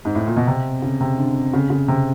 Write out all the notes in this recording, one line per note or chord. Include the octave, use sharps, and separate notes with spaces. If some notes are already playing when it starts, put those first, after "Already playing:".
G#2
A2
A#2
B2
C3
C#3
C3
D3
C#3
C#3
C3